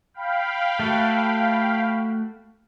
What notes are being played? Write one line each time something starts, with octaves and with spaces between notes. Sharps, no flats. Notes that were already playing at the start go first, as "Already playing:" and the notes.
F5 G5 B5
A3 F#4